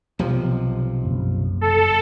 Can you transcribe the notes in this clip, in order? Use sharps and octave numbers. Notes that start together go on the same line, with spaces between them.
B1 C3 F3
F#1
A4